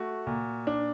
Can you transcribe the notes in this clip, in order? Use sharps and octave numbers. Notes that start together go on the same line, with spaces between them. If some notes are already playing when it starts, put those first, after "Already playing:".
Already playing: A3 F#4
A#2
D4